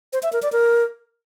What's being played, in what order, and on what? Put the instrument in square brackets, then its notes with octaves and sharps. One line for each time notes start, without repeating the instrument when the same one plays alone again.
[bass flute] C5
E5
A#4
D5
A#4